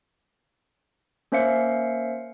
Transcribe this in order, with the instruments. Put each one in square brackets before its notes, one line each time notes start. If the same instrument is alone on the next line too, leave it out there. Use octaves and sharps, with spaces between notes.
[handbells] A#3 C#4 C5 E5 F5 C#7